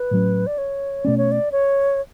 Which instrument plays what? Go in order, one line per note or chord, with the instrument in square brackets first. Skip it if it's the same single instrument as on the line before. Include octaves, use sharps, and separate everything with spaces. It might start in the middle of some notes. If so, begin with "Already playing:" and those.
Already playing: [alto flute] B4
[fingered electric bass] A2 F#3 C#4
[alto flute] D5
C#5
[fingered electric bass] B2 A3 C#4 [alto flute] D5
[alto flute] C#5
D5
C#5